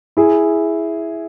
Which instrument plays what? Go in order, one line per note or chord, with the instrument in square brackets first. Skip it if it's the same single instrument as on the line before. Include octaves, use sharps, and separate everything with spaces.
[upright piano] E4 G#4